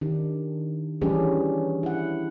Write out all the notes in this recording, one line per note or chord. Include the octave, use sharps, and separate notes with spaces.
D#3 D4 G4
E3 G3 C#4 D4 G4 G#4
E4 F#5